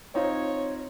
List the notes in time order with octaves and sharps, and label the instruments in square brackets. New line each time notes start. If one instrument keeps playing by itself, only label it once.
[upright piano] C4 D#4 F4 [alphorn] C#5